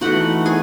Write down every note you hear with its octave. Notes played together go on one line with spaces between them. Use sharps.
E3 A3 D#4 F#4 F#5
G#4 G#5